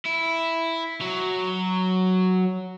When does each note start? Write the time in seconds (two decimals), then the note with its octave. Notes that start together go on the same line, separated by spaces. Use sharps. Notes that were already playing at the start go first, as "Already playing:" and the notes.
0.06 E4
1.01 F#3